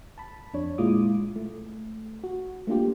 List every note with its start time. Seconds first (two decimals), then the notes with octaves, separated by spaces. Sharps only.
0.18 A5 B5
0.54 F2 D4 C#5
0.78 A#2 G#3 E4 F4 D6 D#6
1.36 A3
2.24 F#4
2.67 A3 A#3 D4 F4 G4